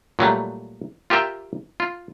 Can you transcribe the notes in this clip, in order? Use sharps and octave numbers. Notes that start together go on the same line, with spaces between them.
A#2 F#3 G3 A3
F4 G4 A#4 E5 G5
F4